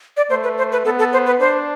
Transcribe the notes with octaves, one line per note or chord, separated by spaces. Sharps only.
D5
A3 C5
B4
C5
B4
B3 A4
A4
C5
B4
D4 C5